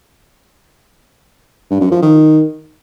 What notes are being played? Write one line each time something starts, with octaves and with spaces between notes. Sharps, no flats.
G2
F#2
F3
D#3